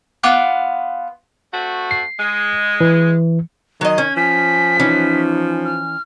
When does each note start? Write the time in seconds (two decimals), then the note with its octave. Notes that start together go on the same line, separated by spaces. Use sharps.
0.23 B3 F4 D6 F#6
1.54 A3 C4 F#4
1.91 C7
2.19 G#3
2.81 E3
3.81 D#3 F#3 D#5
3.98 C#4 G#6
4.17 F3 G#5 B6
4.80 E3 C#4 D#4
5.65 F6